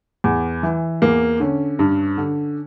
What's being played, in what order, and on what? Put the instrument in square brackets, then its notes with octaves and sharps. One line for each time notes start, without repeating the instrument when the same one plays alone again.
[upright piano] E2
E3
E2 A#3
D3 C#4
G2
D3